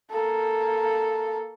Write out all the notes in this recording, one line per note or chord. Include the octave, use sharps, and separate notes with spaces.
A#3 A4